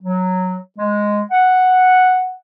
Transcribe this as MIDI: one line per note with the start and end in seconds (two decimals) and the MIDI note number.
0.02 0.57 54
0.78 1.21 56
1.31 2.34 78